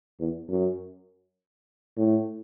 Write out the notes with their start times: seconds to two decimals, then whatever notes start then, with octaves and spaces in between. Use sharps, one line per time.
0.20 E2
0.49 F#2
1.97 A2